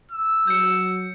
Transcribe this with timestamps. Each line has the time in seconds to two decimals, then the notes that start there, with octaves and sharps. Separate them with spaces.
0.11 E6
0.47 F#3 G6 C#7